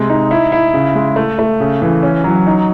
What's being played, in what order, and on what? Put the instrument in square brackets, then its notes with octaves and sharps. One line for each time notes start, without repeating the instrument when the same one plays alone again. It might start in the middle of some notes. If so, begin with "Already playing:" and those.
Already playing: [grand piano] C3 G#3
D#4
E4
E4
C#3
G#3
A3
A3
C#3
E3
C#4
F#3
D#4